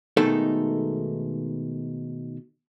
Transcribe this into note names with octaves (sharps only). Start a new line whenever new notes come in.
B2 D#3 G#3 A3 D#4 A4